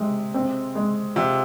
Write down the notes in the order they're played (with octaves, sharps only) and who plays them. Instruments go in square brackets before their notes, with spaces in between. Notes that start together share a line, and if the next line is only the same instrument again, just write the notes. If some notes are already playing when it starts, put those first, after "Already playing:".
Already playing: [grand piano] C3 [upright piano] G#3
[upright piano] C4
G#3
[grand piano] C3 [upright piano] F4